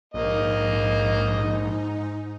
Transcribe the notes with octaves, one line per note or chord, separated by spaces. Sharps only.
A#1 G#2 A#3 D#4 D#5